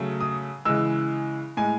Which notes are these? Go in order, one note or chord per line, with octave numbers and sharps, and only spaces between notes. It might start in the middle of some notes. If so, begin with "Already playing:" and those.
Already playing: C#3 F#3 A3
D#6
C#3 E3 G#3 E6
A2 G#3 G#5